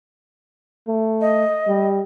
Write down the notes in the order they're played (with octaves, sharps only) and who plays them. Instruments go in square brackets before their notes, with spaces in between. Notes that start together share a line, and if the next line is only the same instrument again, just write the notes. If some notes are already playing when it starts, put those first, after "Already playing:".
[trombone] A3
[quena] D#5
[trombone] G3